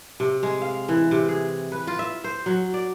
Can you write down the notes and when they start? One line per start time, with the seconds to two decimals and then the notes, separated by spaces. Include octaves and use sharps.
0.20 C3
0.43 G#3
0.62 F5
0.89 E3
1.11 C3
1.29 G#4
1.72 B4
1.87 F4
1.99 E5
2.24 C5
2.46 F#3
2.74 D5